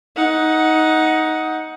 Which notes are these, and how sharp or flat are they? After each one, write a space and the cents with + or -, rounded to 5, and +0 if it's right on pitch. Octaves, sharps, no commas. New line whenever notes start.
D#4 +15 F#5 +0